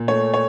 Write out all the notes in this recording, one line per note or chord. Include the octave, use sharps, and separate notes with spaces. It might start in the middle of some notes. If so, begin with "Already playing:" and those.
Already playing: A#2
A3 C#5
C#5